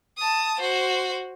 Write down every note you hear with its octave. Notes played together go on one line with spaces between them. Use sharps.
A5 D#6
F#4 C5